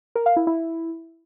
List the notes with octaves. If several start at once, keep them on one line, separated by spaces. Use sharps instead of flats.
A#4
F5
E4
E4